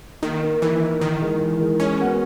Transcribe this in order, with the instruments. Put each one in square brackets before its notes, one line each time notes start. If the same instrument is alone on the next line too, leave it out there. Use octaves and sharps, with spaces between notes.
[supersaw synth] D#3 [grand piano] A#3
[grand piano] D#4 A#4
[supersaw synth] E3 [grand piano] A#3
[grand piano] D#4 A#4
[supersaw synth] D#3 [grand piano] E3
[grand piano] G#3 D#4 A#4
E3
G#3 D#4 A#4
[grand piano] G#3 [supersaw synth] C#4
[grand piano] B3 F#4 A#4